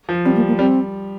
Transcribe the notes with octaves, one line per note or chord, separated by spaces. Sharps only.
F3
G3 C4
A#3
A#3
G3 C4